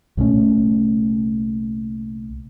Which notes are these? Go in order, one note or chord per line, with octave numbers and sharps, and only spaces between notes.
C2 A#2 A3 C#4